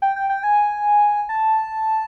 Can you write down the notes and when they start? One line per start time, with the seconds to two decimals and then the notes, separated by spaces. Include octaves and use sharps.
0.02 G5
0.16 G5
0.30 G5
0.43 G#5
1.29 A5